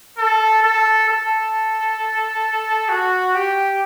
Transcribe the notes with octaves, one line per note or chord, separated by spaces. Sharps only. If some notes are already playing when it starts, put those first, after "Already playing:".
A4
A4
A4
F#4
G4